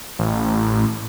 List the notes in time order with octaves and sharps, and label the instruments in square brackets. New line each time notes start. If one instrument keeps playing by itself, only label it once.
[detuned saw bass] A1